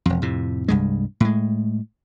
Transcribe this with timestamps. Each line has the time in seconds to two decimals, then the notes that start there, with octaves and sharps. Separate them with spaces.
0.06 E1 F2
0.22 F2 A2 C3
0.68 C2 G2 G#3
1.20 A2 G#3